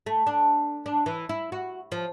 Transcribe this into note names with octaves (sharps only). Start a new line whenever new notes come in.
A3
D4
D4
E3
E4
F#4
F3